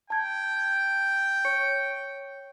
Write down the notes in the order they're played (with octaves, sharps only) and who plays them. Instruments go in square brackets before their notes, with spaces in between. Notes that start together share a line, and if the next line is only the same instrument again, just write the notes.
[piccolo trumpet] G5 [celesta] A5 G#6
[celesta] C#5 C#6 C#7